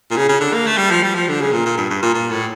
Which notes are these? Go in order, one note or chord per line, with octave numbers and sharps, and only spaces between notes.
A#2
C#3
C#3
D3
A#3
A3
G3
F3
G3
F3
D3
C#3
A#2
A#2
G2
G2
A#2
A#2
A2